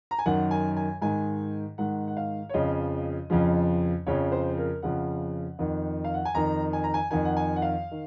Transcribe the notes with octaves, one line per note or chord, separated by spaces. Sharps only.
A#5
G#5
F#2 D#3 F#5
G#5
G#5
G#2 D#3 G#5
G#2 D#3 F#5
F#5
F5
C#5
F2 C#3 F3 D#5
F2 C#3 F3
F2 C#3 F3 C#5
C5
A#4
F2 C#3 F3 F#5
F2 D#3
F5
F#5
G#5
F2 D#3 A#5
G#5
A#5
G#5
F2 D#3 G#5
F#5
G#5
F#5
F5
D#3